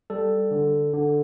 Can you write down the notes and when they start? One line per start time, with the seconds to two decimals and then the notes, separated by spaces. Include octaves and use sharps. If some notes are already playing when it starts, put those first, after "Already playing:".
0.10 G3 A4
0.51 D3
0.93 D3